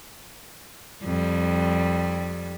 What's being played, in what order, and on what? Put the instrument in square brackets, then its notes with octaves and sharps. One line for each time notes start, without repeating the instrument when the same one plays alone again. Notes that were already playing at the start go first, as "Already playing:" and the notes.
[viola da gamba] F2 G3